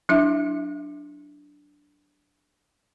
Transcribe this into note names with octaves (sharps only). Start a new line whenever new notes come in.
F#3 D4 E4 E5